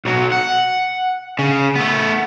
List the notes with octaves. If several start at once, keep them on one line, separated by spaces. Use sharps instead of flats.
B1 F#3
F#5
C#3
A3 B3